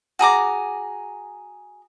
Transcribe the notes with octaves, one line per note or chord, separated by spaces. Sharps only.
F#4 G#4 A#5 D6